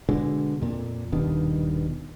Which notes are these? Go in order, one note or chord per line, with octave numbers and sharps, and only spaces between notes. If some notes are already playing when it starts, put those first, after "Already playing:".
B2 D3 G#3
F2 A#2
D#1 G2 B2 D#3